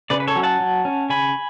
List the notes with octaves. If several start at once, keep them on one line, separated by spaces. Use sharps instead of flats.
C#3 B4 D5
B4
A4 C#5
F#3 C#4
F#5 A5
F#3
C#4
C#3 G#5 B5